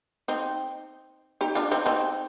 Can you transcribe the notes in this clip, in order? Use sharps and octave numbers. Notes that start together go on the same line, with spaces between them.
C4 D#4
D#4 G4
D4 F4
C4 D#4
C4 D#4